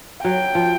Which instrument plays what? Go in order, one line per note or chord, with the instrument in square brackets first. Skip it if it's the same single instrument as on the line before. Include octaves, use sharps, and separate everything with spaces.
[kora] F#3 [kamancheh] G5
[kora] F3